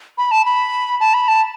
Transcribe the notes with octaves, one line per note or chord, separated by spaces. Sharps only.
B5
A5
B5
A5
B5
A5